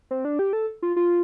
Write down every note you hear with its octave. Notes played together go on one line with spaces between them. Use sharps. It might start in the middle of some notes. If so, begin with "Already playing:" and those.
C4
D4
G4
A4
F4
F4